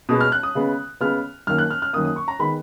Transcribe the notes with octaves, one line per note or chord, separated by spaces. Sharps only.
B2 G#3 B3 D#6
F6
F#6
D#6
C#3 G#3 B3
C#3 G#3 B3 F6
F#2 D#3 A#3 F6
F#6
F6
F6
F#2 D#3 A#3 D#6
D#6
C#6
A#5
D#3 G#3 B3 B5